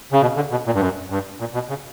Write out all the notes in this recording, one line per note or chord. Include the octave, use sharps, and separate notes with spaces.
C#3
B2
D3
B2
A#2
G2
F#2
G2
A#2
B2
C#3